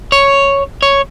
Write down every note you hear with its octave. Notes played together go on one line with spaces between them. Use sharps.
C#5
C#5